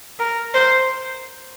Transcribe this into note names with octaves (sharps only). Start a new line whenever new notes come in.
A#4
C5